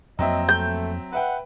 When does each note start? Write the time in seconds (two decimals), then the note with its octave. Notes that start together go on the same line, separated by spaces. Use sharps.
0.19 F2 F#3 A#3 C4 D#5 E5
0.49 A3 G6
1.13 B4 E5 F#5 G5